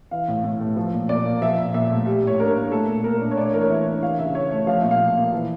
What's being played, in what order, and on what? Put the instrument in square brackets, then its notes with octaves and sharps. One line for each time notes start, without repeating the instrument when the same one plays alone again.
[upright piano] E3 F5
A2
A2
A3
F3
A#2
A#2 D5
A#3
F3 E5
A#2
A#2 E5
A3
G3
A2 C#5
D4 A#4
A#3
A3 A4
A#2
A#2 A#4
D4
C#5
A3 D5
C#5
E3 A#4
C#5
E3 E5
D4
E3 F5
C#3 E5
C#3 C#5
A3 C#5
F3 F5
A#2 E5
F5
A#2
A#3
E3